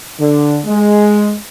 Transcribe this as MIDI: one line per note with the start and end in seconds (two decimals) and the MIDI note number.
0.20 0.59 50
0.66 1.35 56